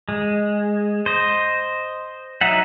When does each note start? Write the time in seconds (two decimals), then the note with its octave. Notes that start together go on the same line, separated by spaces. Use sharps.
0.09 G#3
1.06 C5 D#5
2.41 F#3 D#4 E5 F#5